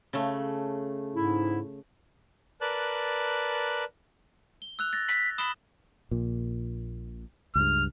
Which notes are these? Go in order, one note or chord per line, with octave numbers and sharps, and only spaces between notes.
C#3 A3
G#2 E4
A#4 B4 D5 A5 F#6
G7
E6 F#6 F7
A6 A#6
B6
B5 D#6 E7 G7
A#1 A#2
C#2 G2 F6